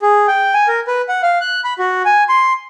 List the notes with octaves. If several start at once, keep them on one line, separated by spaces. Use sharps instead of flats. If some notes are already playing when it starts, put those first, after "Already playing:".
G#4
G5
G#5
A#4
B4
F#5
F5
F#6
B5
F#4
G#5
C6